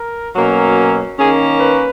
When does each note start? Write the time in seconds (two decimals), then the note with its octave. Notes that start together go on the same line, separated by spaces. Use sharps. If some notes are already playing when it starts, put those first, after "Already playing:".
Already playing: A#4
0.35 B2 F#3 A#3 C#4
1.19 D#3 A#3 C#4 G#4
1.60 B4